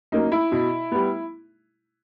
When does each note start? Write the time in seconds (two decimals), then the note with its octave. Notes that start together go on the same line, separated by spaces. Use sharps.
0.12 F#3 A#3 C#4 D#4
0.32 E4
0.52 B2
0.92 G3 B3